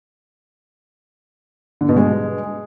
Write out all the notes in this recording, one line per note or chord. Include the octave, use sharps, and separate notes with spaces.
D3
B2
G#3